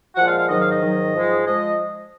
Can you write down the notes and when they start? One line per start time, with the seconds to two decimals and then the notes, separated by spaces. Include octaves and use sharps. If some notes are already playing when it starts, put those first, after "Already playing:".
0.16 A#2 F3 G#3 F#5
0.27 F5
0.38 F5
0.49 G#2 D#3 F#3 D#5
0.60 F5
0.71 D#5
0.81 G#2 D#3 F#3
1.14 G#2 F3 G#3
1.45 F3 G#3 D#5